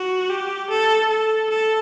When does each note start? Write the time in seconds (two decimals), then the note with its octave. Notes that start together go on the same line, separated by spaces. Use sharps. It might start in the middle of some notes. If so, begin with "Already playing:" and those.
Already playing: F#4
0.30 G4
0.70 A4
1.09 A4
1.50 A4